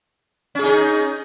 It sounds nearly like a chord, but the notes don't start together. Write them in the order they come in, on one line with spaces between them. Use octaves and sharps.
C#4 G#4 D#4